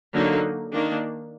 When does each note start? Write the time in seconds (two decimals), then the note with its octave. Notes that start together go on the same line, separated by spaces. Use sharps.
0.14 D3 F#3 A#3 D#4
0.72 D#3 A#3 D4